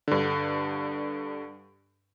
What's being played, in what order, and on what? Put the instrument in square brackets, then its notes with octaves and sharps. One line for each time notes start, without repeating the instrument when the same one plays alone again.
[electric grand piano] G2 D3